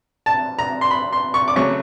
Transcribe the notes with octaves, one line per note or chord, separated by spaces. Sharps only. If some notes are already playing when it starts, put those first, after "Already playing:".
A5
A#5
C6
B5
C6
C#6
D6
C#3 F#3 A3 C#4 C#6